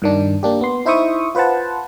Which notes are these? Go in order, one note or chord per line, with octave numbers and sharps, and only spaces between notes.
G2 D#3 D4
A#3 D4 G4
B3 C6
D#4 E4 C5 E5 C#6 D#6
F4 B4 C5 F#5 A5